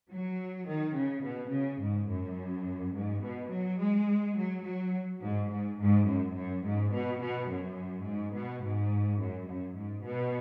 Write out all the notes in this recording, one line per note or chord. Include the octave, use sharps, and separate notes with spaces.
F#3
D#3
C#3
B2
C#3
G#2
F#2
G#2
B2
F#3
G#3
F#3
F#3
G#2
G#2
G#2
F#2
F#2
G#2
B2
B2
F#2
G#2
B2
G#2
F#2
F#2
G#2
B2